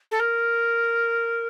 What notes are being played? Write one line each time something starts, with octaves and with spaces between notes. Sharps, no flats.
A4
A#4